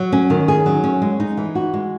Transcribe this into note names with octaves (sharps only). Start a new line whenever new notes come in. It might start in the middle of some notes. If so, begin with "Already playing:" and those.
Already playing: F#3
C#4
D#3
G#4
F#3
C#4
G#3
D#4
E3
F#4
G#3